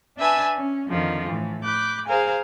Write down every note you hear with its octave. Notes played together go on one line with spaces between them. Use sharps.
D4 B4 E5 G#5 A5
C#4
F2 D3 D#3 F3
A2 E3
B5 D6 F#6 G6
G#4 A#4 C5 F5 G#5